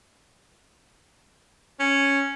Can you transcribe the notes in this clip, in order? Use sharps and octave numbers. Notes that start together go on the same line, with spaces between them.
C#4